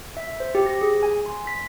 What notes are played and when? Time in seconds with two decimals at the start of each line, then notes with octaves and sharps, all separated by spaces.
0.17 E5
0.40 C5
0.55 G4
0.66 A#6
0.81 G#4
1.03 G#5
1.26 C6
1.47 B6